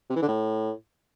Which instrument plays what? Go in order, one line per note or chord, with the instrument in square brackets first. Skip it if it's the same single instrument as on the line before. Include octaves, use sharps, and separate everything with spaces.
[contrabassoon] C3
E3
D3
A2